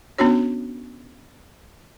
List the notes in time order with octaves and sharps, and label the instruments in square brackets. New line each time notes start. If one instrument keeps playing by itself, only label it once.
[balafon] B3 C#4 D4 F#4 C#5